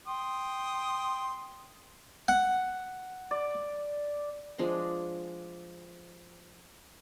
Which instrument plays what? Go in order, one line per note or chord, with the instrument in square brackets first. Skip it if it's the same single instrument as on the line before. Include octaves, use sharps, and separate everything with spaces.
[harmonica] G5 C6 D#6
[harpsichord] F#5
[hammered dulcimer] D5
[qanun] F3 G#3 D4 D#5